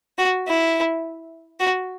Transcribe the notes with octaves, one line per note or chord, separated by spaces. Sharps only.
F#4
E4
F#4